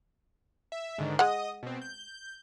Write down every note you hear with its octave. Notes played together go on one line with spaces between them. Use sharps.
E5
G#2 D3 D#3
G#3 D#5 F#5 D#6
B2 C4
G6